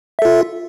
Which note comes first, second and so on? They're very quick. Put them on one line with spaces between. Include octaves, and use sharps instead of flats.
E5 A4 F4